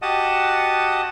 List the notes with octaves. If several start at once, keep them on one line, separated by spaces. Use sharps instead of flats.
F#4 G4 D#5 F#5 A5 D#6